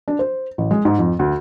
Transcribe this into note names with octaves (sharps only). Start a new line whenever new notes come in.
D4
C5
A1
G#3
G#2
F2
D2